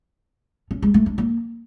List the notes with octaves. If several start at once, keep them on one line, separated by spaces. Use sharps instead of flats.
C#4
G#3
A3
D4
A#3